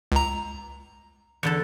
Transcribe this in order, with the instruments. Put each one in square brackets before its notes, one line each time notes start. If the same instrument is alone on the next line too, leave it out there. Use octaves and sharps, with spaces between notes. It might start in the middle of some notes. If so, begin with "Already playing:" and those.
[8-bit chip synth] C#2 A#5
[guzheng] E2 D3 A4